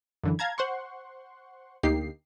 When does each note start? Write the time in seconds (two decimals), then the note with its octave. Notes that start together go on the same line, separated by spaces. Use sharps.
0.23 F#2 D3 E3
0.39 F5 A5 A#5 G#6
0.58 C5 F#5 C6 C#6
1.83 D2 A#3 D#4 G4 C7